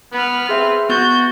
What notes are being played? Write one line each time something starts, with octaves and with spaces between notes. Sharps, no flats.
B3 B4 F6
C4 G#4 E5
B3 F#4 G6 A6